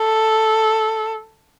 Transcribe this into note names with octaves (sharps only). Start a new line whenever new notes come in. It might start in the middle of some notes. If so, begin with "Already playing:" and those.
Already playing: A4